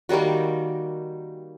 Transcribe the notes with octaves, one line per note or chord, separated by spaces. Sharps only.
D#3 G3 A#3 F#4